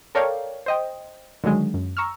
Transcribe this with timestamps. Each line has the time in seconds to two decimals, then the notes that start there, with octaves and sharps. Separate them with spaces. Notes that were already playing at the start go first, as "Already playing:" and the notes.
0.15 A4 A#4 C#5 D5 F5 G5
0.66 C5 D#5 G5
1.44 D3 D#3 F#3 G#3
1.74 F#2
1.97 A#5 C#6 E6 F6